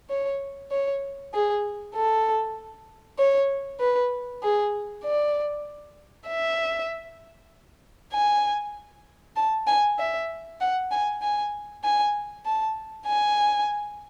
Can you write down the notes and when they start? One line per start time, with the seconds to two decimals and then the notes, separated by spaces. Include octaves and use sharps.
0.10 C#5
0.71 C#5
1.34 G#4
1.95 A4
3.19 C#5
3.80 B4
4.43 G#4
5.04 D5
6.28 E5
8.13 G#5
9.36 A5
9.67 G#5
9.99 E5
10.60 F#5
10.91 G#5
11.22 G#5
11.84 G#5
12.46 A5
13.07 G#5